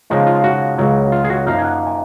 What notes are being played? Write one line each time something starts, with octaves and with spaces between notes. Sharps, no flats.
C#3 F3 G#3 D#4
F4
F#4
C#2 C#3 F#3
F4
G#4
F#4
F#2 F3 A#3 D#4 F5
G#5
F#5
G#5